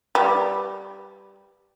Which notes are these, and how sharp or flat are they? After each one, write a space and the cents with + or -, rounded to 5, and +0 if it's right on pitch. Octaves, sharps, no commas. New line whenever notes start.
G3 +0 B4 +0